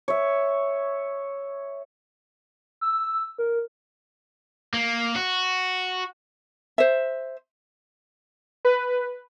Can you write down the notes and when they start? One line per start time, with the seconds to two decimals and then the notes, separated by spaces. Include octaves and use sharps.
0.08 C#5 E5
2.81 E6
3.38 A#4
4.74 A#3
5.16 F#4
6.78 C5 E5
8.65 B4